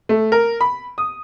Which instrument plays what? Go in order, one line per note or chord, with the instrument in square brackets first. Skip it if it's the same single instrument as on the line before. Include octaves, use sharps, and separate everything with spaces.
[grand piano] A3
A#4
B5
D#6